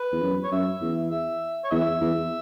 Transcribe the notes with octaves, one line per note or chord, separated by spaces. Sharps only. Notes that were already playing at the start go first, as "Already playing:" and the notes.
Already playing: B4
E2
F#2
C#5
F#2 E5
E2
E5
C#5
E2 E5
E2